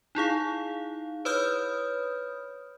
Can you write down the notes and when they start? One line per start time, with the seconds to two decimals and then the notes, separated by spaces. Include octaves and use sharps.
0.15 D#4 E4 G#4 F5
1.25 B4 C#5 B5 D#6 F6 G6